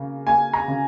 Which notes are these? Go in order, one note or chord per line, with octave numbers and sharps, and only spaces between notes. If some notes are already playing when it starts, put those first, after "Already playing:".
Already playing: C#3 A#3
A#3 G#5
A#5
C#3